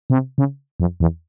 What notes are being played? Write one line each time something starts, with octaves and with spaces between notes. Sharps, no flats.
C3
C#3
F2
E2